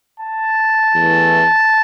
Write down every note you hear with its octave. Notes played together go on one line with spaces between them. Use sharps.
A5
E2 E3 A3